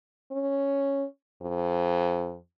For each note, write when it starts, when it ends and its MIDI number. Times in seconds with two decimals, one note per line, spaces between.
0.31 1.04 61
1.41 2.37 41